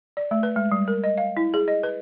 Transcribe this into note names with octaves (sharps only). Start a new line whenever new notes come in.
D5
A3
B4
G#3
G3
A#4
D#5
F5
E4
G#4
D#5
B4